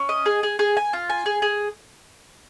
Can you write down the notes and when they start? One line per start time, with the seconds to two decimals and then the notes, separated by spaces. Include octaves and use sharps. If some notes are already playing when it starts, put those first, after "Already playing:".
Already playing: C#4
0.09 D#5
0.26 G#4
0.43 G#4
0.59 G#4
0.77 G#5
0.93 F4
1.10 G#5
1.26 G#4
1.42 G#4